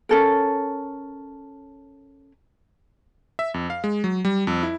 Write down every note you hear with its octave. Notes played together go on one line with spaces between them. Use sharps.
C#4 A4 A#4
E5
F2
F5
G#3
F#3
G3
F2
E4